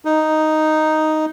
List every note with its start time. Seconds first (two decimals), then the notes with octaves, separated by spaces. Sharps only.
0.05 D#4